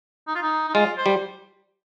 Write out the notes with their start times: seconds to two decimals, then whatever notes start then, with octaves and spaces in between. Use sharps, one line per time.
0.27 D#4
0.35 F4
0.42 D#4
0.68 D#4
0.74 G#3 F4
0.97 C5
1.06 G3